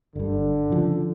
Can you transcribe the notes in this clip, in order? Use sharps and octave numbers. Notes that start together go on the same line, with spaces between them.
G1 G2 D3
C#3 F3